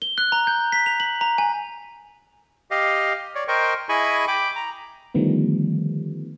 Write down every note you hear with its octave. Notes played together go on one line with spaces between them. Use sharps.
G7
F#6
A#5
G6
B6
F7
F#7
A#5
G#5
G4 D#5 F5
C#5 D5
A#4 C5 D#5 G5 C#6
E4 G#4 D#5 G#5 B5 C#6
G5 B5 D6
A#5
D3 D#3 F3 G3 A3 B3